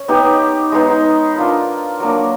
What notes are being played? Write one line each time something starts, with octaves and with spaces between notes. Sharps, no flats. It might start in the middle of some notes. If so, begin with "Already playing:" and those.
Already playing: C#4
B3 D#4 G4
G#3 B3 D#4
D4 F4 A#4
F#3 A#3 D4